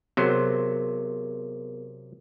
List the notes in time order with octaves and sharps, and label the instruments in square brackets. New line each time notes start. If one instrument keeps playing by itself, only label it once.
[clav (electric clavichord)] C3 F#3 C5 [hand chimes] B3 G#4 A#4